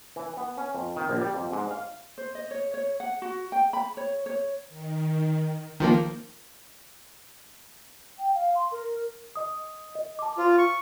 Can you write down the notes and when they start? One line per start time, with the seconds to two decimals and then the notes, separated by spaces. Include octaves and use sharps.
0.16 E3
0.37 B3
0.57 C#4
0.75 F2
0.96 D#3
1.09 A#1
1.21 G3
1.34 F2
1.52 G#2
1.71 F5
2.18 C5
2.35 D#5
2.51 C#5
2.74 C#5
3.00 F#5
3.22 F#4
3.52 G5
3.73 B5
3.97 C#5
4.26 C#5
4.68 D#3
5.80 D#3 F3 A#3
8.19 G5
8.35 F5
8.55 C6
8.72 A#4
9.36 D#5 D#6
9.95 D#5
10.19 A5 D6
10.38 F4 C5
10.58 C#6